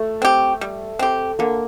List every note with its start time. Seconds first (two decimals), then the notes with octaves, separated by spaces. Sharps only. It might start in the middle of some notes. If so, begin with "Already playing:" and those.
Already playing: A3
0.22 C4 G4
0.61 G3
0.99 C4 G4
1.39 D3 A#3